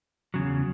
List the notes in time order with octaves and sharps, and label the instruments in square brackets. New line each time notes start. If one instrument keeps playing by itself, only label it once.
[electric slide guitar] E2 C#3 F#3